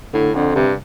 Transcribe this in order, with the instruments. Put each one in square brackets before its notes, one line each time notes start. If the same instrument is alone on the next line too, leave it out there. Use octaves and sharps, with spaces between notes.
[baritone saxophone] A2 [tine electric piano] D3
[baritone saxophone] F2 [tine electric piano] D3
[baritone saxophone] G2 [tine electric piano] C3